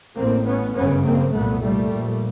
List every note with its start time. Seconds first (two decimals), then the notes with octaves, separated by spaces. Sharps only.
0.16 A1 A2 A#3 C4
0.45 B3 C#4
0.74 G1 F#2 C#3 B3 C#4
1.03 A#3 C4
1.33 C2 A#2 A3 B3
1.62 G3 A3
1.91 A#1 A#2